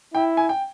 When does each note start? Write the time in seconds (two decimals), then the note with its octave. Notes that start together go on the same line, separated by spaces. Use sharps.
0.14 E4 G5
0.37 G#5
0.49 G5